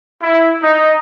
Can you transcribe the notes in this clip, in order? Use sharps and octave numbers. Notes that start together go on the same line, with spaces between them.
E4
D#4